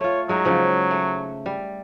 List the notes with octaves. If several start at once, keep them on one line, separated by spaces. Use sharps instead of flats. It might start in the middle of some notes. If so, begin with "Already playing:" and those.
A3 F4 C#5
F#3 G#3 D#4
C#3 F3 G#4
A3
G3